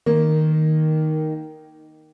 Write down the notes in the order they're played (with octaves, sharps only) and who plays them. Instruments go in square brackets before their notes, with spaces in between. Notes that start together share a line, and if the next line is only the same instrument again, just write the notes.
[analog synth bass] D#3 [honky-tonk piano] A#3